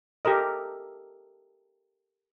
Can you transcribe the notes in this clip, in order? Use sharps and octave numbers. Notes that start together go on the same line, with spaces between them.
G4 A4 A#4 D#5